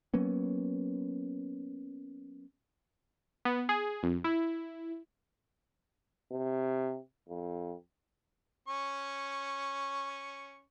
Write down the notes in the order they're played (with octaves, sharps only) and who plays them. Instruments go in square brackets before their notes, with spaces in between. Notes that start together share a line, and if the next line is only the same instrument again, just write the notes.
[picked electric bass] F#3 A#3 B3 C#4
[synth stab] B3
G#4
F2
E4
[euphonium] C3
F2
[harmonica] C#4 C#6